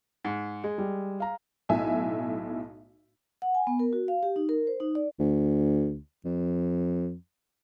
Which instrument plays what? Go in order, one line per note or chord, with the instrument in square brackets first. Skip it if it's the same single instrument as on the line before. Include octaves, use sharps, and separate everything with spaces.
[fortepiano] G#2
G#3
[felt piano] G3
F5 A#5
[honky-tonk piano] B1 A2 E5 G#5
[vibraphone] F#5
G#5
B3
A#4
F#4
F5
G4
D#4
A#4
C5
D#4
D5
[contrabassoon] D2
F2